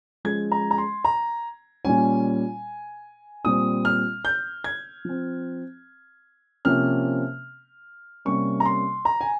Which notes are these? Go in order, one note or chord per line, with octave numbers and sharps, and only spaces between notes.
F3 G#3 C#4 G#6
A#5
A#5
C6
A#5
A#2 G3 C#4 G#5
A#2 G3 C4 D#6
F6
G6
G#6
F3 C4
C3 F3 A#3 C#4 F6
C3 G3 A#3 C#4 C#6
A#5
C6
A#5
G#5